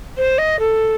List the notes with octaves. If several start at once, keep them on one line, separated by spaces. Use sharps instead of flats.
C5
D#5
A4